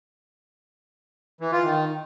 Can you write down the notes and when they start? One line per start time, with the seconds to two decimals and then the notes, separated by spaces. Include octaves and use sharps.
1.41 E3
1.52 F4
1.63 D#3